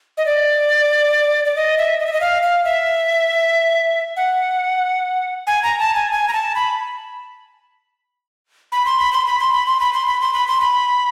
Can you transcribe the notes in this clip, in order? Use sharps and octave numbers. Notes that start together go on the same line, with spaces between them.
D#5
D5
D5
D#5
E5
D#5
E5
D#5
F5
F5
E5
F#5
G#5
A#5
A5
G#5
G#5
A#5
A5
B5
B5
C6
B5
C6
B5
C6
B5
C6
B5
C6
B5
C6
B5
C6
B5